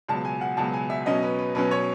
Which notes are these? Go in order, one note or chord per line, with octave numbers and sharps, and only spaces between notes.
C#2 B2 F#3 A5
G#5
F#5
C#2 B2 F#3 A5
G#5
E5
B2 F#3 C#4 D#5
B4
B4
B2 F#3 C#4 B4
C#5